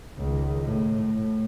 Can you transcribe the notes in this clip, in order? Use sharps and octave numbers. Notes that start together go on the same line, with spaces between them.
C#2 D#3
A2
A2